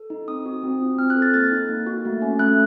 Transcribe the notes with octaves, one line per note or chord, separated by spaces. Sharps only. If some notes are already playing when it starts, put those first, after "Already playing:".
Already playing: A4
D#4
C4 D#6
F#4
C4
F4
C4 F6
F#6
A4
A6
A#3 A6
D#4
A#3
F#4
A3
C#4
A3 F#6